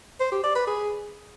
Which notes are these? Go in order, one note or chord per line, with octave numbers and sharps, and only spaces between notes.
C5
G4
D5
B4
G#4